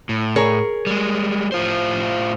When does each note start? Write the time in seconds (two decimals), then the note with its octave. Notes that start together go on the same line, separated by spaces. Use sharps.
0.09 A2
0.36 G#4 A#4 C#5
0.87 G3 G#3
1.52 A2 F4 C5